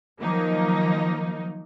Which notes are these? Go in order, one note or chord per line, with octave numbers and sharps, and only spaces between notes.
D#3 F3 F#3 A#3 D#4